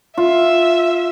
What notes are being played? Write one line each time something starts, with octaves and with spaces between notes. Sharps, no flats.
F4 E5